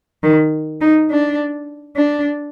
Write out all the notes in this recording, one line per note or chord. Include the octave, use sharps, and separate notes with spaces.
D#3
D#4
D4
D4